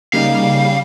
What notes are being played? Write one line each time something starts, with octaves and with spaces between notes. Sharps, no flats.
C#3 G3 A#3 D#4 F5